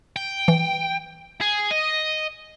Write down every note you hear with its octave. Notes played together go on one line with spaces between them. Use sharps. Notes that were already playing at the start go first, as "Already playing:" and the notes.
G5
E3
G#4
D#5